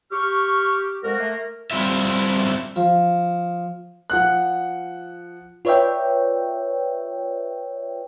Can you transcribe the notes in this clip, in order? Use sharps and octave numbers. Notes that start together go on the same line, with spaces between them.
G4 C#6 F6
F2 G#3 F#4 A#4
A3 A#3
G3 C4 E4 F4 E5
F3
F3 F#5 F#6
F4 B4 C#5 D5 E5 G5